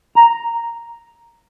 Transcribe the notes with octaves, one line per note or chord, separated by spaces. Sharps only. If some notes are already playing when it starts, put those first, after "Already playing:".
A#5